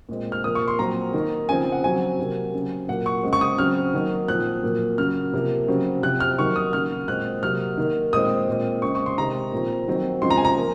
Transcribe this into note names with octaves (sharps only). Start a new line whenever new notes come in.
A#2 G#3 C4
F6
A#2 F3 A#3 D#6
C#6
C6
A#2 F#3 C4 A#5
D#3 A#3
C#3 F3 C4 G#5
F#5
C#3 F#3 C4 G#5
C3 F#3 A#3
C#3 F#3 C4
A#2 F#3 A#3 F#5
C#6
C#3 G#3 C4
C#6
D#6
C#3 F#3 C4 F6
D#3 F#3 A#3
A#2 F3 C4 F#6
A#2 F#3 A#3
C#3 F#3 A#3 F6
C3 F3 A#3
C#3 F#3 C4
C3 F3 C4 F#6
F6
D#3 F#3 A#3 C#6
D#6
C#3 F#3 A#3 F6
A#2 G#3 C4 F#6
C3 F#3 A#3 F6
D#3 A#3
A#2 G#3 C4 D#6
A#2 G#3 C4
C#3 G#3 C4 C#6
C#6
C6
C3 D#3 G#3 C4 A#5
A#2 F3 C4
D#3 F#3 C4
C#3 F3 G#3 C4 C6
A#5
G#5
A#5
A#3